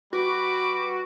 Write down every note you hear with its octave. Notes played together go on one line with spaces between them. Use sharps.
G3 F#4 B4 D6